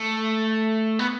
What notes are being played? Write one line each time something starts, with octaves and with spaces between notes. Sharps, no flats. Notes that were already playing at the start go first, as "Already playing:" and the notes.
Already playing: A3
B3